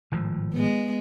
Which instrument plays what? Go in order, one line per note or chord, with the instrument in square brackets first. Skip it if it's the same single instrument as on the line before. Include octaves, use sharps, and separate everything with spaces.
[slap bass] G#1 A2 F3
[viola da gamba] G#3 B3